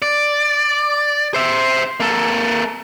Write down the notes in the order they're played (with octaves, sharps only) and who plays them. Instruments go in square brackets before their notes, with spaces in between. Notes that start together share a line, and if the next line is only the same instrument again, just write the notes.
[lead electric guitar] D5
C5 E5
A#3 A4